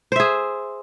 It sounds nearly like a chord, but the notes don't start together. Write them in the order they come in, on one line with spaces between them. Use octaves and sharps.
C5 E5 G#4